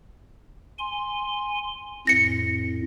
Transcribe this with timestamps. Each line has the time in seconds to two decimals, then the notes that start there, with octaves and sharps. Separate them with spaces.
0.79 G#5 C6
2.07 F2 A2 A#6 C#7